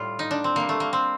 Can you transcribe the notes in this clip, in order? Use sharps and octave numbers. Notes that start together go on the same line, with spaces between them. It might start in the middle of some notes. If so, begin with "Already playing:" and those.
Already playing: A2 G3 F4
D#4
D4
C4
C3 G3 A#3
A3
A#3
C4